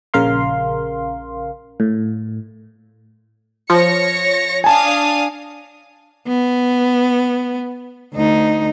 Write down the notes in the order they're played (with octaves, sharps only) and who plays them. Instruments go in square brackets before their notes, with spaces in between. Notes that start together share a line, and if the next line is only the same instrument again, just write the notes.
[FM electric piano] A#1 C#3 A#4 F5 C6
A2
[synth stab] F3 [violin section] C#5 A#6 C#7
[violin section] D4 F5 D#6 [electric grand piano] G#5 A5
[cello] B3
D2 D#4